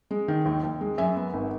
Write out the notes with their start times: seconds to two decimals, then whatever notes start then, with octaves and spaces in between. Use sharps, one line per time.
0.11 G#3
0.28 D#3
0.46 D#2
0.63 D#2
0.81 G#3
0.98 F#2 E5 G#5
1.16 B3
1.34 G#1